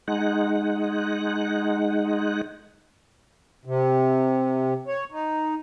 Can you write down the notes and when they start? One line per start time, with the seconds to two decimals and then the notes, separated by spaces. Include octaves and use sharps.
0.08 G#3 D#4 F#5
3.65 C3
4.87 C#5
5.12 D#4